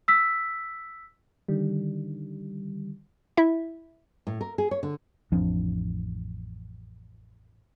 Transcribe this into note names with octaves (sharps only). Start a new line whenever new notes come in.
E6 B6
D3 D#3 G3
E4 E5
A2
A#4
G#4
C#5
D3
A1 F2 F3 C4 D4